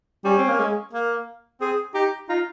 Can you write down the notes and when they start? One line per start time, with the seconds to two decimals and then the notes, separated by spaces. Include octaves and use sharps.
0.24 G3 C#4
0.38 C4
0.48 A#3
0.59 G#3
0.93 A#3
1.61 C4 G#4
1.94 D#4 G4
2.29 D#4 F4